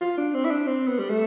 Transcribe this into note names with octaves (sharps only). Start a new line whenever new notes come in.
F4
D4
C4
E4
D4
C4
B3
G3
A3